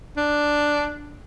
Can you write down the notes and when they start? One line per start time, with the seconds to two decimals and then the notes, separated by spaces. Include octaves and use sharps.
0.17 D4